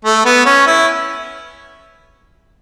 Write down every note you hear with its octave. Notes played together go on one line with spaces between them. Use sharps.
A3
B3
C#4
E4